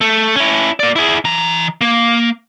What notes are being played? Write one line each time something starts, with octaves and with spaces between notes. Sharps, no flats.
A3
C#4 E4
A#3 D5
E4 G#4
E3 A#5
A#3